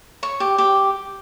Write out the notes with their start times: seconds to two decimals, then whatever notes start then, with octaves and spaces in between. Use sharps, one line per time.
0.23 C#5 C#6
0.40 G4
0.58 G4